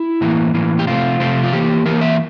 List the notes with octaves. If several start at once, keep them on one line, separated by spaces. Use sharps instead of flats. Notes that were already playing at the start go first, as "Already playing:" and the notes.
Already playing: E4
A2 E3 A#3
A2 E3 A#3
G4
C3 F3 A3 C4 F4
C3 F3 A3 C4
F4
E3 A#3 G4
E3 A#3 A#4
E5